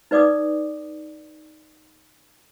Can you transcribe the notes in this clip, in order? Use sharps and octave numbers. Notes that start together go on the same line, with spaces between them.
D#4 B4 D5 D6 D#6